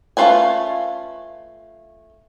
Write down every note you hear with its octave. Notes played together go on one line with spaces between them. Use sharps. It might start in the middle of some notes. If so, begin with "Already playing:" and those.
A3 C#4 F4 B4 G#5